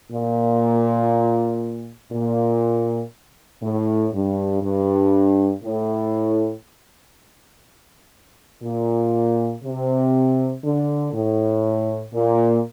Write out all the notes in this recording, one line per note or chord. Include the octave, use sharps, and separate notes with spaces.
A#2
A#2
A2
G2
G2
A2
A#2
C3
D3
A2
A#2